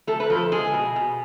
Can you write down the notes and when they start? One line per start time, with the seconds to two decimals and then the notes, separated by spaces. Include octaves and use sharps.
0.07 A3 A4
0.20 B4
0.30 F3 A4
0.52 G#3 G#4
0.74 B2
0.96 B2